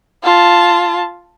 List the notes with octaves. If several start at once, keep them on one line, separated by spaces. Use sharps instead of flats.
F4 A5